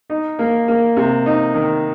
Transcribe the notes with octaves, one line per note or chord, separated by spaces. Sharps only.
D#4
A#3
A#3
C3
D#4
D#3